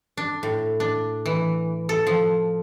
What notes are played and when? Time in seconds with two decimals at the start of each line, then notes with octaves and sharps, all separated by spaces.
0.17 D4
0.43 A2
0.80 D4
1.26 E3
1.89 A4
2.07 F3